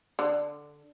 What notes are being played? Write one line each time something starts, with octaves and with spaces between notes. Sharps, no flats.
D3